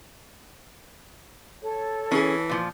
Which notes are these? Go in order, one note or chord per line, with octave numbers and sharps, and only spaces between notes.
A4 C#5
E3 C#4 G#4
A#2 F3